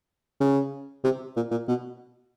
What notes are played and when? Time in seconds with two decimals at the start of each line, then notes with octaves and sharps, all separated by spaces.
0.40 C#3
1.04 C3
1.36 A#2
1.51 A#2
1.68 B2